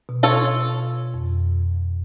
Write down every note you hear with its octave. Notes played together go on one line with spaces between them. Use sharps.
B2
F4 A4 C#5
F2